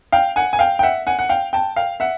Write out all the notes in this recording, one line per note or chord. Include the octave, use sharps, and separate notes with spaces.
F5 G5
F#5 G#5
G#5
F5 G5
G5
E5 F#5
F#5 G#5
F#5
F5 G5
G5 A5
F5 G5
E5 F#5